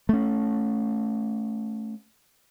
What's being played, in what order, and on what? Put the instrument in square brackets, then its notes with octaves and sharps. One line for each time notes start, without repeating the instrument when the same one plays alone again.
[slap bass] A3 C#4